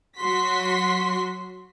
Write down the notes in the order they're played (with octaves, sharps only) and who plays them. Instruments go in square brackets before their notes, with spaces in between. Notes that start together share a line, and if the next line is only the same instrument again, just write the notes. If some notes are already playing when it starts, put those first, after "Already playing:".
[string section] F#3 F#4 C6 B6